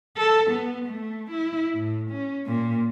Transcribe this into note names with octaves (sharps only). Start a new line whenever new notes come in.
A4
B3
A3
E4
A2
C#4
A#2